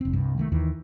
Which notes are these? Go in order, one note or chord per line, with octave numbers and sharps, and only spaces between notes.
F1 C4
C2 G2
D#3 G#3 A3
D#2 D#3 E3